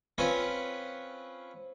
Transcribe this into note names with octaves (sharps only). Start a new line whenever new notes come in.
C4 C#4 F4 B4 C#5